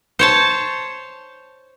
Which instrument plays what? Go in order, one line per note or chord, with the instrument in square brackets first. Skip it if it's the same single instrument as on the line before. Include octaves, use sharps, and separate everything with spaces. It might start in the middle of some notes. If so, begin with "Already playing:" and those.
[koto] C5 C#5 A5